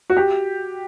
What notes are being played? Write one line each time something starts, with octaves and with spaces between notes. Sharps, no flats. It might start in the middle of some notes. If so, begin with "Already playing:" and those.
F#4
G4